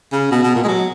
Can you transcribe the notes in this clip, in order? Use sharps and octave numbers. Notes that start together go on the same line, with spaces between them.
C#3
B2
B2
A#2
G#3
F#3